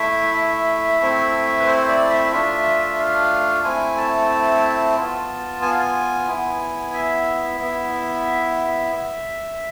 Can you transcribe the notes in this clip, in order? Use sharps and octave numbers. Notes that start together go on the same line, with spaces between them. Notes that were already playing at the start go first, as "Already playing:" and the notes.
Already playing: A3 E4 E5
E5
A3 C4 E4
B4
C5
D5
E5
A3 D4 F4 E5
F5
A3 C4 E4 G#5
A5
B3 F4
G#5
F5
G#5
B3 E4
E5
B3 E4